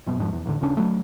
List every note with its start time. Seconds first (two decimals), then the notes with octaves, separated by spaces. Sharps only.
0.06 F1 F#2 B2
0.19 F2 G#2 C#3 F3
0.33 E2
0.46 A1 D3
0.61 D#1 C#3 C#4 D4
0.77 F#3 A3